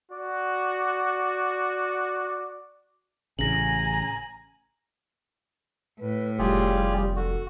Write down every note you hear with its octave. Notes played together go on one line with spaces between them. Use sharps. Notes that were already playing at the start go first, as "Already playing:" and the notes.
F#4 D5
A1 C#3 G#5 A#5 A#6 F#7
A2 B4
F1 G3 F4 G4 G#4
F#4 A4